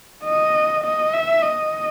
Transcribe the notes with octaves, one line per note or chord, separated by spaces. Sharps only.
D#5
D#5
E5
D#5